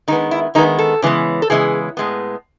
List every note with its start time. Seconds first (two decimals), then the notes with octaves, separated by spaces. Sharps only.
0.08 D#3 G#3 B3 D#4
0.31 E4
0.55 D#3 G#3 B3 D#4
0.79 A4
1.02 C#3 E3 G#3 B3
1.42 A4
1.50 C#3 E3 G#3 B3 G#4
1.97 A2 G#3 B3